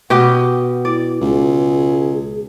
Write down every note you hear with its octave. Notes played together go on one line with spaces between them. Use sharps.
B2 G4 D#5 F#5
E4 D5
C#2 G#4